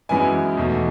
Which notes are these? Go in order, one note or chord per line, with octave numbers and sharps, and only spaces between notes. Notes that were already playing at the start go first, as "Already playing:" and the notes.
F#2 E3 G#3 B3 E4 G#5
E2 B2 A3 D#4